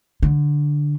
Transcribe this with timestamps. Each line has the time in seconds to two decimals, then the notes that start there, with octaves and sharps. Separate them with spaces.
0.23 D3